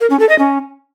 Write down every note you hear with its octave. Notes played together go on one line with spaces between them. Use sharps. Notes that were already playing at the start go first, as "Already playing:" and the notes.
A#4
C#4
A4
D#5
C#4